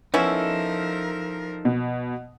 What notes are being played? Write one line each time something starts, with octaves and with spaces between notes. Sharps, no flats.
F3 B3 C#4 D#4 E4 A4 A#4
B2